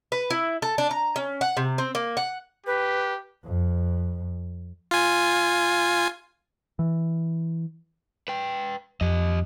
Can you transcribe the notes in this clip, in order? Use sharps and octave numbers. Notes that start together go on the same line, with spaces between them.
B4
E4
A4
D4
A#5
C#4
F#5
C3
C4
A#3
F#5
G4 B4
F2
F4 G#5
E3
B4 G5
F2 G4 D#5